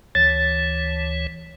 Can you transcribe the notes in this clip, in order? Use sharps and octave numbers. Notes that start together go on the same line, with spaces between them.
D2 E3 C#5 A6